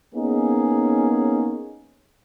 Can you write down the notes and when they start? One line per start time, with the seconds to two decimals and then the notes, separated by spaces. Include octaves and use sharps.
0.15 A#3 B3 C#4 D#4 G#4